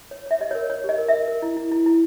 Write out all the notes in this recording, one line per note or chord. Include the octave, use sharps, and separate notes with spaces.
C#5
C#5 E5
G4 D#5
A#4 C#5
C#5
G4 D#5
A#4
A#4 E5
A#4
E4
E4
E4
E4